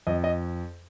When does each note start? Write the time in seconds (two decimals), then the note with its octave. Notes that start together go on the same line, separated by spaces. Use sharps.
0.07 F2 D#5
0.24 D#5